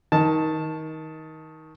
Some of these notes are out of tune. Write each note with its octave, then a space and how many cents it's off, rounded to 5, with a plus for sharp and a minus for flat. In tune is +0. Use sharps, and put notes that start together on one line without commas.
D#3 +20 A5 +0